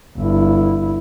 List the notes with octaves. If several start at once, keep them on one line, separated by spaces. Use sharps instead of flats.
G1 E4